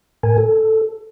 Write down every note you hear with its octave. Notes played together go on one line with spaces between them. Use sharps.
A2 A#4 G#5
A4